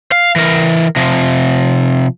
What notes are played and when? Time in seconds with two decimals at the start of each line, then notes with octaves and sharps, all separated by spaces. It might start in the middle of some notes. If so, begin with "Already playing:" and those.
0.12 F5
0.36 E3 A#4
0.96 C3 F3